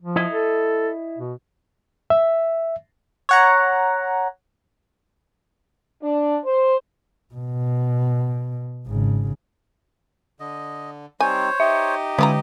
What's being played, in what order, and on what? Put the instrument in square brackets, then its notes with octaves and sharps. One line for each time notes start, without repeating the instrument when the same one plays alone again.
[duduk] F3
[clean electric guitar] E4 D#5
[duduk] A4
B2
[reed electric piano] E5
[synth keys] C#5 F#5 A#5
[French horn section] D4
C5
[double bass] B2
G#1 C#3
[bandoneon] D3 [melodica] D#5
[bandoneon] G3 C4 D#4 [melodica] C5 C#5 [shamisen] G#5
[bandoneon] D#4 G4 D#5 [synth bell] E5
[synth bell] D3 [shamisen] C#4 F4 A#5 [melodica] E4 D6 D#6